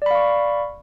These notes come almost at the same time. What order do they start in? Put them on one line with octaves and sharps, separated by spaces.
D5 B5 F5 C#6